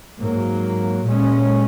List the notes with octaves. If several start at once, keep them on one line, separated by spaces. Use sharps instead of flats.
G#2 F#3 A#3
A#2 G#3 C#4